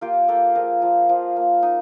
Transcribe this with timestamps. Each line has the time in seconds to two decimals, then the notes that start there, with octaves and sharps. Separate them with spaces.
0.01 A#3 F4 G4
0.28 A#3 G4 A4
0.55 F3 G#4 A#4
0.82 F3
1.09 F3
1.36 A#3
1.63 D#4